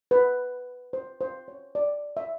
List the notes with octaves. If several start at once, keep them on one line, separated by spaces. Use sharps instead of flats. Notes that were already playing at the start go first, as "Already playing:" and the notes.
B4
C5
C5
C#5
D5
E5